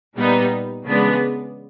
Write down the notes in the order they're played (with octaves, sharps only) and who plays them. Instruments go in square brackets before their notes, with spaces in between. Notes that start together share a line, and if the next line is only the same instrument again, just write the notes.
[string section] A#2 G3 B3 D#4
C#3 E3 G#3 B3 D4